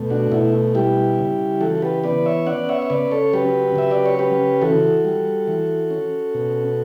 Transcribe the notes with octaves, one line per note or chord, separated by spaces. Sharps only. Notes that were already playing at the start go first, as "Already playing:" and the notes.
Already playing: B2 A3
D4 F#4
B2 E4
G3 E4 G4
C#3
E3 F#4 A4
A4
G4 B4
B3 B4 D5
C#5 E5
C#4 D5 F#5
C#5 E5
E5
C#3 B4 D5
A4 C#5
F#3 G4 B4
C#3 E5
D5
C#5
C#4 G4 B4
E3 F#4 A4
G3
E3
C#4
B2